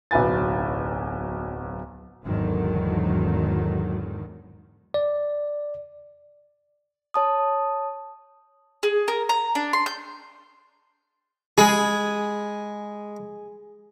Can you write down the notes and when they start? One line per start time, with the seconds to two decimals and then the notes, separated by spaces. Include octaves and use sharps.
0.11 D1 B1 F#3 B4 G#5 A6
2.25 G#1 E2 G#2 D3 D#3 F#3
4.94 D5
7.14 C#5 A5 D#6
8.83 G#4
9.08 A#4
9.29 A#5
9.55 D4
9.73 C6
9.86 G6
11.58 G#3 G#4 B5